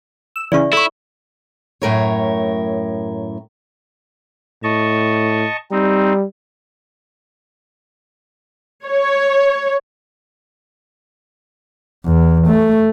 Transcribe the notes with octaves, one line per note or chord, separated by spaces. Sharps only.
E6
C#3 E3 D5 E5 C#6
E4 A4 C#6
F#2 A2 A#4 C#5
A2 D#5 A5 C#6
G3 C4 D#4
C#5
E2
A3